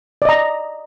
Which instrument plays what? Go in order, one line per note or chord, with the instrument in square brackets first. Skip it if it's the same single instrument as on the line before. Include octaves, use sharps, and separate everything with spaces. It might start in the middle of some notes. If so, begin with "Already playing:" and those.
[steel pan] D5
D#5
A#5